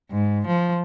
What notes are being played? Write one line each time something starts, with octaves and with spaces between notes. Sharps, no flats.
G#2
F3